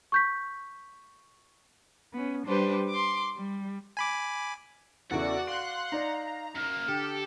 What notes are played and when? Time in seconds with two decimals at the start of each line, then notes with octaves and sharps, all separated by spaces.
0.12 C#6 G6 B6
2.13 B3 C#4
2.45 G3 D4 G4 B4 C5
2.89 C6 D6
3.36 G3
3.97 G#5 B5 D6
5.11 E2 C#3 E3 F#4 A4 D5 F#5
5.47 F5 C6 F#6 D7
5.92 D#4 D5 A#5
6.56 F#2 A#3 F6
6.88 D3 G4 A4